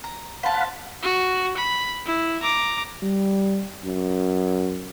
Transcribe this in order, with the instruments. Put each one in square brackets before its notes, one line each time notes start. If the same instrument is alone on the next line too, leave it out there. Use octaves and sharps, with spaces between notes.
[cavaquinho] A#5
[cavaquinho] C5 A5 [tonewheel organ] F5 F#5 B5
[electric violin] F#4
B5
E4
A#5 D6
[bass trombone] G3
F#2